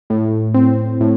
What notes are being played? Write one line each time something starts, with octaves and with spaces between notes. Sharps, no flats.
A2
C4
A2